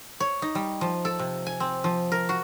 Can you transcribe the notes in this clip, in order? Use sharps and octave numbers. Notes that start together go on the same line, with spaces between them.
C#5
D#4
G3
F3
A4
C3
G#5
C4
F3
A#4
F#4